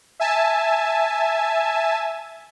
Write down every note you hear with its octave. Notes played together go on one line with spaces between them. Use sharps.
E5 G#5 A5